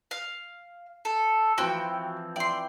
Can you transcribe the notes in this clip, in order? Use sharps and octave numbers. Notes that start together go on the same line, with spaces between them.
F5 F6
A4
E3 F3 C4 F#4 G5
D5 E5 G5 C6